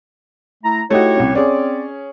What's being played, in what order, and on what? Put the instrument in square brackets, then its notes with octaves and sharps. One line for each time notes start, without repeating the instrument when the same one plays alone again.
[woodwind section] A3 E4 A#5
[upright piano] A3 D#4 F#4 [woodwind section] E4 G4 C#5
[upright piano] C2 C#4
[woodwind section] C4 D5 [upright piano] C#4 G#4